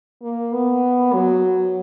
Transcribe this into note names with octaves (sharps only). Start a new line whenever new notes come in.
A#3
B3
F#3